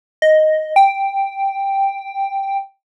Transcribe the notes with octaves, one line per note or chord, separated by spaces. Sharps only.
D#5
G5